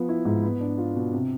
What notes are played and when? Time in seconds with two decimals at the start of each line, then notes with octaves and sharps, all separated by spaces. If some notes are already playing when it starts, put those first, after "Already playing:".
Already playing: F3 B3
0.09 E4
0.25 G#2
0.43 B3
0.60 D4
0.78 F4
0.95 B2
1.13 C3